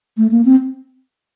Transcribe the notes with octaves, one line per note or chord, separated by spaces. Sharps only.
A3
A#3
C4